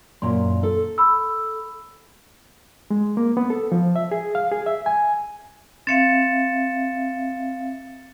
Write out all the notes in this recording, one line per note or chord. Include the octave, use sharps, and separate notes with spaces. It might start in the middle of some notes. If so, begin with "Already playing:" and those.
F#2 A#2 A#5 C6
A4
B5 E6
G#3
A#3
B3
A4
F3
E5
G#4
F5
G#4
E5
G#5
C4 E5 F5 A6 C#7 E7